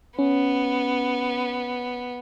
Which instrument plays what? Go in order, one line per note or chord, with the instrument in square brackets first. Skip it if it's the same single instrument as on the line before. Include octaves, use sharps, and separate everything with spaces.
[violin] B3 [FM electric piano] C#4